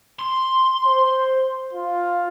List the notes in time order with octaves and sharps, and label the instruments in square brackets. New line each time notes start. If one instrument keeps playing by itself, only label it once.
[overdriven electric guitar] C6
[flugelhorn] C5
F4